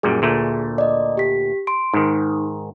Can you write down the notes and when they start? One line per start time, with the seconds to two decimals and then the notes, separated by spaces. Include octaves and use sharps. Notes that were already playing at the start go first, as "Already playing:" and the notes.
0.03 F#2 A#2 G3 G#4
0.22 D2 A#2 A3
0.78 D5 D#5
1.17 G4 B6
1.67 C6 D7
1.94 G#2 D#3 D#4